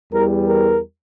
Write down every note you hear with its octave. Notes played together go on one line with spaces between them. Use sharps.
E2 E3 G3 A#4
A#4